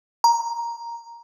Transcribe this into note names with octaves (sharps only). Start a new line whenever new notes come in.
A#5